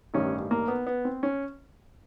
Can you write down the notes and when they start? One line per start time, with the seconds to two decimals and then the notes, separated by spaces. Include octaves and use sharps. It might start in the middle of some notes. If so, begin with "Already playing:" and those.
0.14 A1 G2 D#3 C#4
0.51 A#3
0.68 B3
0.87 B3
1.05 C4
1.23 C#4